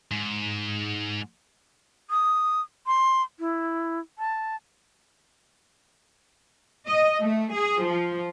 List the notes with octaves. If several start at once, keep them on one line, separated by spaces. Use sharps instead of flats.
G#2
D#6
C6
E4
A5
D#5
A3
G#4
F3